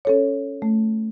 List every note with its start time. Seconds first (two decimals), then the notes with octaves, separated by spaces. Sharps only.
0.05 C#4 A4 C#5
0.62 A3